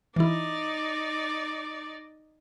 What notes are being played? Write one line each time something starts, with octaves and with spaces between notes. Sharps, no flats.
E3 D#4 E4 D5